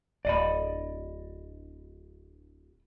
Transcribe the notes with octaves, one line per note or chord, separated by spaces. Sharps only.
D1 D5 D#5 B5